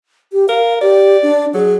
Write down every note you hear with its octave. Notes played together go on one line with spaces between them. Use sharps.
G4
A#4 F5
G4 D5
D4
F#3 G#4